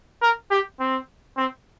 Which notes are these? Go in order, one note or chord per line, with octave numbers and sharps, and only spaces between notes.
A#4
G4
C4
C4